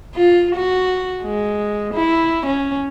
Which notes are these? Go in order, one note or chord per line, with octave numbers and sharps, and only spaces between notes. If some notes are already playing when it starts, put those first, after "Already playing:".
F4
F#4
G#3
E4
C#4